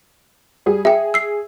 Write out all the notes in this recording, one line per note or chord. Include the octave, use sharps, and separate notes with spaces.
G3 G#4
G#4 E5 G5
E6 C7